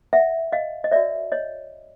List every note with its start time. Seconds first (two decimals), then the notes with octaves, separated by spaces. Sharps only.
0.13 E5 F#5
0.52 D#5 F5
0.84 D#5
0.91 F#4 A#4 C#5 D5 E5
1.32 C#5 D#5